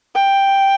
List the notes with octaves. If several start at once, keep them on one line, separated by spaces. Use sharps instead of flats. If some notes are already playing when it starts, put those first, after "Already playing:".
G5